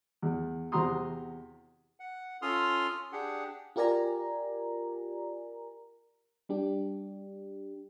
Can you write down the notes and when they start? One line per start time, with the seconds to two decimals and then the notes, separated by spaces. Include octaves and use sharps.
0.22 E2
0.72 E2 C3 F#4 A#5 C6 D#6
2.00 F#5
2.42 C#4 F4 A4 C6 D#6 F6
3.13 D4 G4 G#4 F#5
3.76 F4 G4 A#4 D5 G#5 A#5
6.49 G3 D4 G4